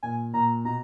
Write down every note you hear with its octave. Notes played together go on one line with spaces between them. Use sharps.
A#2 G#5
A#2 A#5
B2 A#5